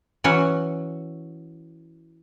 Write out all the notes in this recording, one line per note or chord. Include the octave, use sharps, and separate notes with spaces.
E3 F#3 C#4 F#4